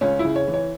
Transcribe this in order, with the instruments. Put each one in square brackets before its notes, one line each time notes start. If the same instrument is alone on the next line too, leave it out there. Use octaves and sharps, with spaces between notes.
[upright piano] C#2 C#4
E4
C#3
C#5
E3
C#5